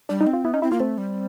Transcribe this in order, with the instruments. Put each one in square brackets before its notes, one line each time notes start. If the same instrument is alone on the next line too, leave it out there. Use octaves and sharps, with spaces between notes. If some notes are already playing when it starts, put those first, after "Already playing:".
[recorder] G3 [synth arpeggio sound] D4
[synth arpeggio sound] D#4
[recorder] C4
[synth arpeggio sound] F4
[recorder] B3 [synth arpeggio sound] E4
[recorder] C#4 [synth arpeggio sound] D#4
[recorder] C4 [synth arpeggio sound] E4
[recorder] A#3 [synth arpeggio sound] F4
[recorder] A3 [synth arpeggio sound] C4
[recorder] G3